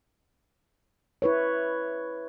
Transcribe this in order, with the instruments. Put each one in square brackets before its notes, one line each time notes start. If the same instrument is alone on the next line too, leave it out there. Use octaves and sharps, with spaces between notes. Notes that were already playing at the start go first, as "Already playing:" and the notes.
[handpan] E4 B4 C#5